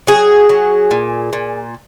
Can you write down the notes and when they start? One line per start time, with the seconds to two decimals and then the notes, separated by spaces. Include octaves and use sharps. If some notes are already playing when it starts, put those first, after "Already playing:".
0.07 F#3 G#4
0.49 F#3
0.91 A#2
1.33 A#2